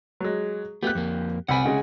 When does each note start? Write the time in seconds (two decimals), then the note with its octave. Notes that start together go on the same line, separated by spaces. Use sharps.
0.20 F#3 G#3
0.83 A3 B3 G4 F#6
0.95 F2 A#3
1.49 C2 F#5 G#5 B5
1.66 C#3 G#3